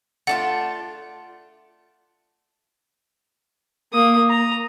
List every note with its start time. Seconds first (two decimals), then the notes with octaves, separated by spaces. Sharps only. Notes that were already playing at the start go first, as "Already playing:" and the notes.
0.27 A3 D4 F4 F#5
3.93 A#3 D#6
4.30 A#5